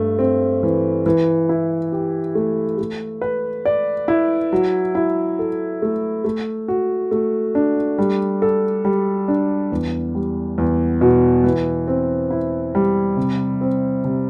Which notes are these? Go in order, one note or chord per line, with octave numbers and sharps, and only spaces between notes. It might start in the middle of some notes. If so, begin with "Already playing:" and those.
Already playing: G2 A3
C4
E3
E3
E4
G4
A3
A3
B4
D5
E4
F#3
E4
A4
A3
A3
F#4
A3
D4
G3
A4
G3
D4
E2
G3
E2
B2
E3
C4
E4
G3
C3
C4
C3